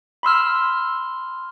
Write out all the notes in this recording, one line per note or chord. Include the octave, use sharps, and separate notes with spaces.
B5 C6 E6 F6